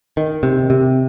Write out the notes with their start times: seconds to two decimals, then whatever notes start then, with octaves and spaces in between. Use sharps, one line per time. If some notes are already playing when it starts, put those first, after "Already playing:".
0.17 D#3
0.43 C3
0.70 C3